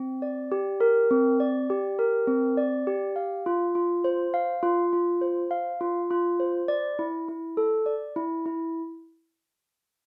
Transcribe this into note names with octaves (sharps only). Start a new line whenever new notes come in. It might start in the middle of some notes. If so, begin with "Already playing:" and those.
Already playing: C4
D5
G4
A#4
C4
D5
G4
A#4
C4
D5
G4
F5
F4
F4
C5
F5
F4
F4
C5
F5
F4
F4
C5
D5
E4
E4
A4
D5
E4
E4